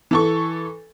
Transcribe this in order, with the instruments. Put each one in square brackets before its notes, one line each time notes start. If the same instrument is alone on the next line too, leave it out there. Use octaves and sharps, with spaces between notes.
[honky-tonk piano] E3 A4 C#6